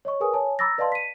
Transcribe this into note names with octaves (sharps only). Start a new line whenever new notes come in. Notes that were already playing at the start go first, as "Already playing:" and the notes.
C#5 D#5 C#6
G#4 A#4 B4 G#5 D#6
C#5 G#5 A5
A#5 B5 D6 E6 A6 A#6
B4 D5 D#5 F5 A5 C6
B6 D#7